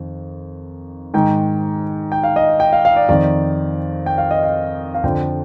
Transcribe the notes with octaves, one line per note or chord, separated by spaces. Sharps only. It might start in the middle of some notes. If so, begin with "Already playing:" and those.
Already playing: F2 D#3
G#2 D#3 G5
G5
F5
D#5
G5
F5
F5
D5
F2 D#3 D5
G5
F5
D#5
F5
F5
F2 D3 F3 G5